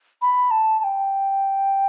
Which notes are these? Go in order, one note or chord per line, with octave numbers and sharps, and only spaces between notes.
B5
A5
A5
G5